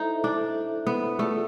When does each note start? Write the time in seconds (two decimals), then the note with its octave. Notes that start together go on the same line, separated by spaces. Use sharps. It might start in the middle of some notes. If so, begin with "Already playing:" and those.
Already playing: D#4 E4 A4 C5 E5
0.24 D4
0.87 B3
1.19 A3 F4 G#4 B4 D5